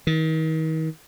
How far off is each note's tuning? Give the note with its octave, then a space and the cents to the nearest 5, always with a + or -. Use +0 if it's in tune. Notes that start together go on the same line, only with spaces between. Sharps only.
D#3 +40